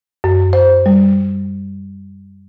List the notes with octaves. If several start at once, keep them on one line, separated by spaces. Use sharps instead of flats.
F#2
C5
G3